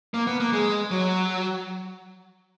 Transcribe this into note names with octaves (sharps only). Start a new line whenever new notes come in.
A#3
B3
A#3
G#3
F#3